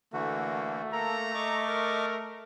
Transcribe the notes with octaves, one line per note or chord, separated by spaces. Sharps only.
D3 E3 A3 A#3 F#4
A#3 A4 A#4 A#5
D#5 C#6 D6
A#4